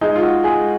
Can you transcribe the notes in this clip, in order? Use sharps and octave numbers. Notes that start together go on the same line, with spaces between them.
G#3 D#4
F4
F#4
G#3 G#4